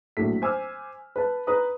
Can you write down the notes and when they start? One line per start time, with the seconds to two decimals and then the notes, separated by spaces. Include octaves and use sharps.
0.17 A#1 A2 F#3 A4 B6
0.42 C5 G#5 D6 E6 F6
1.16 B4 A5
1.47 B4 A#5 D#6